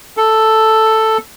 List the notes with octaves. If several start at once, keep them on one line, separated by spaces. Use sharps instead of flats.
A4